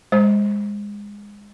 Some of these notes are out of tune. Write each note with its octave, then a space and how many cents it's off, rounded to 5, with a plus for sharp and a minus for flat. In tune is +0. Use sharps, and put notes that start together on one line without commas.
G#3 -20 C5 +0